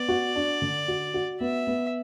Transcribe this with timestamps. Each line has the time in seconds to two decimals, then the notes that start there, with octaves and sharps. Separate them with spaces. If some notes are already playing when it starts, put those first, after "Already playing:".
Already playing: B3 D5
0.09 F#4
0.35 D4
0.62 D3
0.88 F#4
1.14 F#4
1.40 B3 E5
1.67 B3